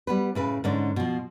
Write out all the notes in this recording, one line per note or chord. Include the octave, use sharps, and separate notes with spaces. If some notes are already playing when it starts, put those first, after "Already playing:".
G3 B3 B4
A2 C#3 B4
G#2 D3 C#4 D4
B2 F3